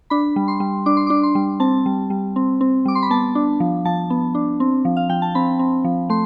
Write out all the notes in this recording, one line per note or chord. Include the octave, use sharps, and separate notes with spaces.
D4 B5
G3
C6
G3
D4 D6
C6
D4 D6
C6
G3
C4 A5
G3
G3
C4
C4
G3 D6
C6
B5
B3 A5
D4
F3
F3 A5
B3
D4
C4
F3
F5
F3 G5
A5
C4 B5
C4
F3
A3 C6